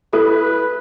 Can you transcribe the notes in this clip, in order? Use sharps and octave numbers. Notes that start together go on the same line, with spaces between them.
E4 A4 B4 D#6 F#6